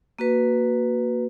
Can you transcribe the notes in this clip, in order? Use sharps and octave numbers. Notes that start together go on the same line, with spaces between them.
A#3 F#4 B4